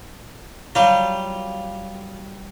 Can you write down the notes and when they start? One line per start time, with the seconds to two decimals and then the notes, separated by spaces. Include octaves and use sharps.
0.75 F#3 G3 F4